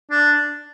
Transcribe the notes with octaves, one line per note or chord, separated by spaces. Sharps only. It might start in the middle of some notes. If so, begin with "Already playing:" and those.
D4